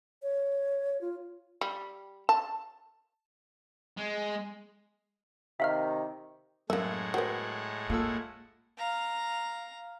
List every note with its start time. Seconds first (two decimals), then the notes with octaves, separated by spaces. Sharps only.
0.23 C#5
1.01 F4
1.61 G3
2.29 A5
3.97 G#3
5.60 C3 D#3 E5 F5 F6
6.70 F#2 A2 G#3 A#3 E5 F#5
7.14 F#3 B3 A#4 C5 G5
7.90 A#3 F4 A4 E6
8.78 F5 A#5